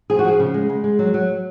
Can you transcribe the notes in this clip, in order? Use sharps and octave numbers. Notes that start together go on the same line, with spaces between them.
F3 G#4
F#4
F3 G#4
C#3
G#3
G#3
G#3
F#3
F#3